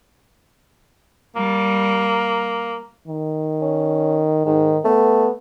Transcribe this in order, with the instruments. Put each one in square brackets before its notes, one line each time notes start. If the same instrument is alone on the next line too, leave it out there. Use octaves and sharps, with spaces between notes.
[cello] G3 [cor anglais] A#3
[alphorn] D#3
[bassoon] C#4
[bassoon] G#2 [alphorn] D#3
[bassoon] A3 [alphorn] B3